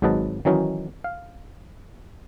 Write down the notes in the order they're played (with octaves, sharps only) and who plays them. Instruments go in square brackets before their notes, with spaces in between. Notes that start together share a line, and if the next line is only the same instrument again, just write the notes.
[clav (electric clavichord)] G#1 G#2 F#3 B4 D#5 A5
D#3 E3 F#3 C#4 D#4
F5